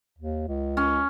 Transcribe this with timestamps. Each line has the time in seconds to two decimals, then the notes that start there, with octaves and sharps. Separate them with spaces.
0.18 D#2
0.48 C#2
0.77 C#4